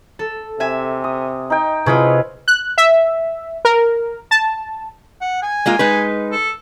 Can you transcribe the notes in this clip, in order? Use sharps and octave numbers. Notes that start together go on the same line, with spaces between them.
A4
C3 E5 G#5
D#6
D#4 G5
C3 E4 F4 G#4 B4 C#5 D#5
F#6
E5
A#4
A5
F#5
G#5
G#3 A#3 F4
G#3 D#4 B4
A4